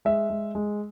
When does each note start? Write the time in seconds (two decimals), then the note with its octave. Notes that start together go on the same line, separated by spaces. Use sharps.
0.05 G#3 E5
0.30 G#3
0.55 G#3